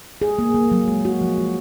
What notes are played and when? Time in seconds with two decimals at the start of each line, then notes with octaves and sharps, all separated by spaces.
0.22 G#4
0.39 A#3
0.54 A#3
0.71 F#3
0.88 G#3
1.05 F#4
1.21 F3
1.38 G#3